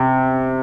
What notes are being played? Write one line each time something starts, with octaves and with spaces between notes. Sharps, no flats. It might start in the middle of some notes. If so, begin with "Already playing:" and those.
Already playing: C3